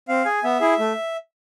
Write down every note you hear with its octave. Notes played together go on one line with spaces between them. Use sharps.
C4 F5
G#4 G#5
B3 E5
E4 G#4
A3